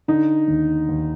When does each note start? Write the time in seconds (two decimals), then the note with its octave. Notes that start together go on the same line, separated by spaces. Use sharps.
0.08 D3 D#4
0.48 D#2
0.89 D#2